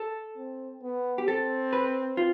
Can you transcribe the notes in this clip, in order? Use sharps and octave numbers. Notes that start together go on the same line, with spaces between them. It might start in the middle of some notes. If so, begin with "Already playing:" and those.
Already playing: A4
C4
B3
G4
C4 A4
B4
F4